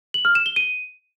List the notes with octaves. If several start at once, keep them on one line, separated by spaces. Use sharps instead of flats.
F#7
F6
E7
G7
D#7